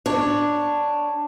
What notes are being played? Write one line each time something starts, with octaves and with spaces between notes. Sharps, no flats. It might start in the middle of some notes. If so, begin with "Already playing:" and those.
D4 C#5